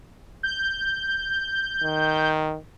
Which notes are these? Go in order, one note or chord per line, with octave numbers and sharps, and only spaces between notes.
G6
D#3